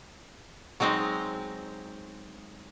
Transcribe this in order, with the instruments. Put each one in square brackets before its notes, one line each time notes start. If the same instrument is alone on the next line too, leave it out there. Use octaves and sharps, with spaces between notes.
[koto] F#3 G#3 C4 D#4 D#5